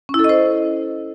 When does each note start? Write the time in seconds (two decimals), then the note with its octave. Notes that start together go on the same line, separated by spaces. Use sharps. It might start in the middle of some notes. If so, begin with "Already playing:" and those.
0.09 C#4
0.14 E4
0.19 A4
0.24 D#5
0.29 C5